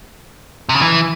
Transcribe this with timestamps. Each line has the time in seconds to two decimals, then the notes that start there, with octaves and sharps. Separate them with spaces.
0.69 C3
0.75 C#3
0.81 E3